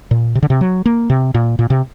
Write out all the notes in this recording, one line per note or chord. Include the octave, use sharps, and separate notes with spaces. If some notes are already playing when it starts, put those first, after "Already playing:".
A#2
C3
D3
C3
F#3
A#3
C3
A#2
A#2
C3